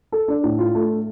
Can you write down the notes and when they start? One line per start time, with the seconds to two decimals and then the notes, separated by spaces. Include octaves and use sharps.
0.12 A4
0.28 D4
0.44 A2
0.59 F4
0.75 A3